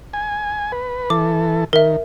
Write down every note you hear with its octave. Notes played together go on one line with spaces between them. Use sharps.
G#5
B4
E3 A4 D6
D#3 A#4 E5